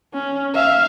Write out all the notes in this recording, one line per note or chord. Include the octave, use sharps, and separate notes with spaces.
C#4
E5 F5